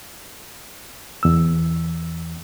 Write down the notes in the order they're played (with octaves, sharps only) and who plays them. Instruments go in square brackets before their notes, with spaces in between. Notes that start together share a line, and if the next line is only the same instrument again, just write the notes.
[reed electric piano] E2 E6